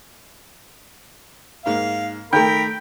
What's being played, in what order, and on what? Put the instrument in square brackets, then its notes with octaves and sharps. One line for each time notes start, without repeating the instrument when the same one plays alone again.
[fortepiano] G#2 A#3 [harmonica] F5
[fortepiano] D#3 A3 [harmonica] A#4 B5 [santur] G5